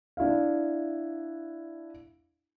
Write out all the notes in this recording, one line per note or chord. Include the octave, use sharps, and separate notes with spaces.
D4 E4 E5 F5